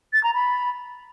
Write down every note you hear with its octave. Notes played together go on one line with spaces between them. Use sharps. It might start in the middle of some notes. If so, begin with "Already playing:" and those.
A6
A#5
B5